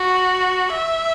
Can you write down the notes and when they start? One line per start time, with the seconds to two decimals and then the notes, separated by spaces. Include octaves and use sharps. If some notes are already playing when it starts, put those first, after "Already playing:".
Already playing: F#4
0.72 E5